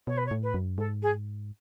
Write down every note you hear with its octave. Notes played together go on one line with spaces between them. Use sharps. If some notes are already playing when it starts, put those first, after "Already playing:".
B2 C#5
B4
C#5
A2
B4
F#2
G#2 A4
G#4